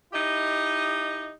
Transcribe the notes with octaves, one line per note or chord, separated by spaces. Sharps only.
D#4 E4 G4 D#5